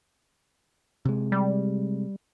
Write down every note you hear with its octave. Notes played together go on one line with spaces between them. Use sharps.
C3 G#3
G3